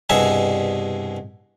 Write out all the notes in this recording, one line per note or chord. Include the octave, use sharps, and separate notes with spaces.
C2 G2 B2 G#4 E5 G#5